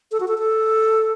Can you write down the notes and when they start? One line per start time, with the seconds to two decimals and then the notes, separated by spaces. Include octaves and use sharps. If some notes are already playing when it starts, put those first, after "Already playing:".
0.12 A4
0.20 F#4
0.28 A4
0.38 A4